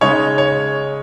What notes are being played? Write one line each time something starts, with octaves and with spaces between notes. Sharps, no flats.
C#3 G#3 D#4 C#5
C#5